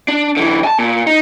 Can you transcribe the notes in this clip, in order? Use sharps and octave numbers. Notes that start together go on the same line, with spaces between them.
D4
D3 E3
G#5 A5
A#2
D#4